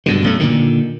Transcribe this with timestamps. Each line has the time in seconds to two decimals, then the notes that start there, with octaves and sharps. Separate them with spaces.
0.06 G2 B2 D3
0.22 B1 F#2 A3
0.40 A#2 D3 D#3